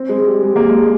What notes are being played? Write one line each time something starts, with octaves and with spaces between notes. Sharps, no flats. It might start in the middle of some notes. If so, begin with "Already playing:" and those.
Already playing: C4
G#3
G3
G#3
A#3
G#3